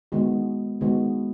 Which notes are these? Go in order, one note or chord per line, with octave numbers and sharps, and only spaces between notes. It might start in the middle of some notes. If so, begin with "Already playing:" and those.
D#3 G#3 B3 F#4
D#3 G#3 B3 F#4